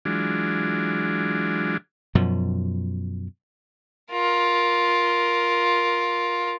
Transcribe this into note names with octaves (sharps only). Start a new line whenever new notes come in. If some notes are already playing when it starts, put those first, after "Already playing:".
E3 F#3 G#3 D4 F4
F#2 B2 F3
F4 A#4